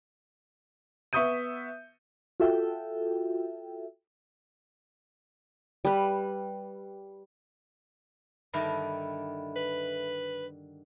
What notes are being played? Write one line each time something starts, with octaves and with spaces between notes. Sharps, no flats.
B3 E5 C#6 D#6 G6 D#7
F4 F#4 A4 E5 G5
G3 B4
G2 D3 D#3 A4 E5 B5
B4